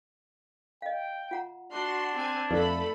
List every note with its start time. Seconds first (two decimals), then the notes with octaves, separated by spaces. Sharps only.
0.82 D#5 F5 G5
1.31 F4 F#5 A#5
1.71 D4 F#4 C6
2.14 C4 G#5
2.51 F2 A3 D#4 A4 B4 D5 B5